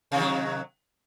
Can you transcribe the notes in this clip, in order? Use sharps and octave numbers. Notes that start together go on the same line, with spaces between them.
C3 D#3 F#3